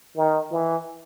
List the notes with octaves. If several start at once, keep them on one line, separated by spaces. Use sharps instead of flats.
D#3
E3